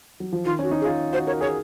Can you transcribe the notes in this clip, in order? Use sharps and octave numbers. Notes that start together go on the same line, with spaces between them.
F#3
F3
D#3 F4
C#4 F#4
D#4
G#4
F4
F#4 C5
A#4 C#5
G#4 C#5